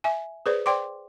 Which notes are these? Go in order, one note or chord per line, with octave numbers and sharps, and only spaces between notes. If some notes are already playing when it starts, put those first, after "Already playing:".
E5 G#5
G#4 B4 C5 D5
C5 D5 G5 C6 D6